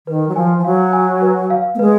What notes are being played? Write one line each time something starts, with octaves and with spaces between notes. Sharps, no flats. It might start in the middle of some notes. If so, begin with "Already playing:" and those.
D#3 B4
F#3
F3 G#5
F3
F#3 F5
G#5
B4
F5
A#3
G#3 B4